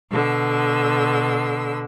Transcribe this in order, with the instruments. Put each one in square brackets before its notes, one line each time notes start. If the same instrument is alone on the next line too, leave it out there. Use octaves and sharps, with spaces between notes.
[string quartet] B2 D3 E6